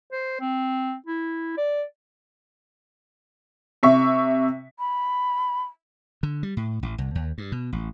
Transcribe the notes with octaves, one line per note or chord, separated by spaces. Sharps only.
C5
C4
E4
D5
C3 E5 C#6
B5
D3
G3
A2
A1
C2
D#2
G2
B2
A1